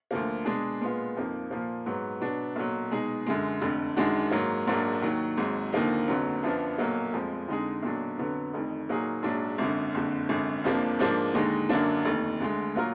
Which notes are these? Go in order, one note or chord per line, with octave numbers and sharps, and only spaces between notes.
D2 D3 F3 A#3
B2 G#3 D4 G#4
A#2 G#3 B3 F4
F2 F3 A#3 D#4
A#2 F3 A#3
G#2 F#3 B3
B2 F#3 B3 D4
B1 A#2 F#3
B2 G#3 D#4 G#4
F#2 D3 G#3
F1 F2 D3
F#2 D#3 G#3 D4 F#4
G#2 F#3 A#3
A#1 G#2 F#3 A#3 D4
D#2 D#3 F#3
G#1 G#2 F#3
D#2 D3 F3 A#3 D#4
F#1 F2 D3 F#3 B3
F#2 F3 B3 D4
B1 A#2 F#3 A#3
F1 F2 F3 G#3
F2 D3 G#3 D#4 G#4
B1 A#2 F#3 D4
F2 D3 F#3 B3
F1 F2 D#3
A#2 F#3 A#3 D#4 G#4
A#1 G#2 F#3 D4
G#1 F#2 D3
F#1 F2 D3
G#1 F#2 D3
F#1 F2 F3 A#3 D4
G#2 F3 A#3 D4
D#2 D3 G#3 D#4
F#2 D3 F#3 A#3 D4
F1 D#2 D#3
D2 D3 G#3
A#2 F#3 A#3 F4 A#4